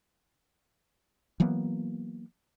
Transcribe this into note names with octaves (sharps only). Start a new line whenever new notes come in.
E3 F#3 A#3 B3